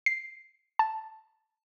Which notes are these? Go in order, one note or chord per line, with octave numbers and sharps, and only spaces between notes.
C7
A5